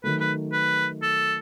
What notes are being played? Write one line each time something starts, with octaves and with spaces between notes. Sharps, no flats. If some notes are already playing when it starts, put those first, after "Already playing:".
D#3 F#3 A3 B4
B4
B4
A4